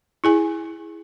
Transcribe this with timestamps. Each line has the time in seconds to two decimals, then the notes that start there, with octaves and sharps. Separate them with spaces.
0.24 E4 G#4 G#5